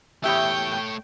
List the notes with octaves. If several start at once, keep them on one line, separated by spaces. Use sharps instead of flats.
E2 A3 G4 C#5 E5 G5